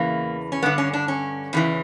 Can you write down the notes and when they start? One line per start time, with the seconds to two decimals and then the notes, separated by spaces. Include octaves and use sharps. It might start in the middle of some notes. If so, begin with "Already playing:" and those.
Already playing: E2 C#3 E3 A#3
0.52 C#4
0.63 G2 D3 B3
0.78 C#4
0.93 D4
1.08 C#4
1.53 E2 C#3 E3